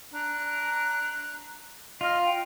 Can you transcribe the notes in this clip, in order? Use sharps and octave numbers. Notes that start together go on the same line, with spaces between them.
D4 A#5 F#6
F4 D#5 F6
G5